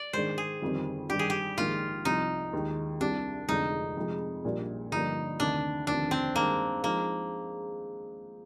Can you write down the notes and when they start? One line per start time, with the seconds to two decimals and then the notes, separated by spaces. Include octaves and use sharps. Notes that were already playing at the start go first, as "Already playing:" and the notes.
Already playing: D5
0.13 G#2 D#3 G#3 D4 C5
0.38 G#4
0.62 G1 F2 D#3 G3 C4
1.09 G2 D#3 G3 G4
1.19 G#4
1.30 G4
1.58 A#1 G#2 D#3 A#3 F4
2.05 C2 C3 F3 D#4
2.53 D#2 D#3 G#3
3.00 C2 C3 G3 D4
3.48 F1 F2 D3 F3 G#3 D#4
3.97 F2 C3 F3 G#3
4.44 A#1 A#2 G3 D4
4.91 G1 G2 D3 F3 A#3 D#4
5.40 D2 C3 D#3 D4
5.87 F1 D#2 D3 F3 C4 D4
6.11 C4
6.35 G2 D#3 G#3 A#3
6.84 F3 G#3 A#3 D#4